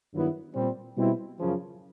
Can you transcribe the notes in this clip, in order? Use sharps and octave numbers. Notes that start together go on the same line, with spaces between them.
G2 D#3 F#3 B3 E4
A#2 G3 C4
B2 G3 C4 E4
F#2 C#3 F3